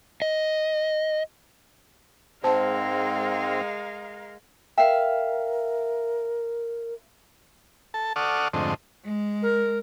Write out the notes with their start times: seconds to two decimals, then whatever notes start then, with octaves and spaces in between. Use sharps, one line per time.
0.22 D#5
2.44 G#2 G#3 C4 A#4 C5 F5 A5
4.78 A#4 E5 F5 G5
7.94 A4 A5
8.16 A4 D5 F#5 C#6 D#6 F6
8.53 F2 G#2 D3 A3 C4 D#5
9.04 G#3
9.42 A#4